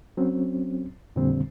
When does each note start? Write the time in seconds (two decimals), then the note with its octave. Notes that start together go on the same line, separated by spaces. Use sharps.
0.17 F#3 C4 C#4
1.16 F2 A#2 D3 F3 G3 C4